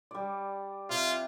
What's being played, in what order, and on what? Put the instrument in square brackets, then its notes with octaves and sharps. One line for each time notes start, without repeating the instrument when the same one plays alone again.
[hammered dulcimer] G3 D5
[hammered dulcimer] C3 [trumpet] F4